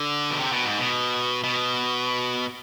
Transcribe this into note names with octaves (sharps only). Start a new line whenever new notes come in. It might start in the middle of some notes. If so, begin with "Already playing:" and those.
Already playing: D3
B2
C3
B2
G#2
B2
B2